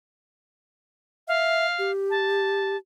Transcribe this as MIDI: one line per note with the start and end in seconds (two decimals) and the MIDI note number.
1.28 1.66 76
1.28 1.91 77
1.79 2.76 67
2.10 2.77 81